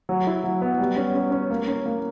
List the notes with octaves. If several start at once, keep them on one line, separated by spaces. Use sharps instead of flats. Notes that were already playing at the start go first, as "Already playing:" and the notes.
F#3
E4
F#3
B3
G3
C#4
C#4
C#4
A#3
C#4
A#3